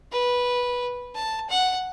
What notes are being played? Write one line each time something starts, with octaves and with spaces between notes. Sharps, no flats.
B4
A5
F#5